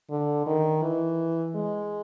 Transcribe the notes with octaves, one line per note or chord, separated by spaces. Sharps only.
D3
D#3
E3
G#3